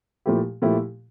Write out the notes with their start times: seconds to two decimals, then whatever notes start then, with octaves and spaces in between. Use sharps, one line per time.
0.26 A#2 F3 A3 E4 G4
0.62 A#2 F3 A3 E4 G4